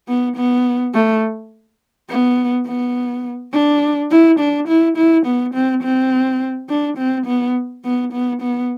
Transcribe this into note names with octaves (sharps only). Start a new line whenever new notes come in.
B3
B3
A3
B3
B3
D4
E4
D4
E4
E4
B3
C4
C4
D4
C4
B3
B3
B3
B3